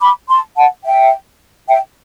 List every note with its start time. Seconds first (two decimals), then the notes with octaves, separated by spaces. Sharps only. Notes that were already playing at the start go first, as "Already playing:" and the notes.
0.01 B5 D6
0.29 A5 C6
0.57 F#5 A5
0.85 E5 G5
1.68 E5 G5